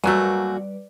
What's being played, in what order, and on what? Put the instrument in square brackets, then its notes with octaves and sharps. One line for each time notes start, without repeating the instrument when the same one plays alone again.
[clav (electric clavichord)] F#2 F#3 A3 [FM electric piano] G3 B4 D5 [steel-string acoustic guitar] A#3 F#4